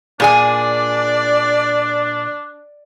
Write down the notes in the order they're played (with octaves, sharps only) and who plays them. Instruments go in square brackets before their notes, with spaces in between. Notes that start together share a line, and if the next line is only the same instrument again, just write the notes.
[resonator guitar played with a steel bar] A#2 G#4 G#5 [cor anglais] D4 [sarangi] D5